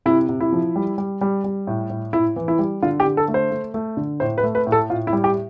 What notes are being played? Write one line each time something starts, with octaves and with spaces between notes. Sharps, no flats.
C3 E4
C3
E4
F3
G3
G3
G3
G3
A2
A2
A2 E4
E3
E4
G3
D3 F4
G4
D3
A4
A3
C5
A3
A3
D3
A2 C5
B4
A3
B4
A2
A4
A2 F4
E4
G3
G4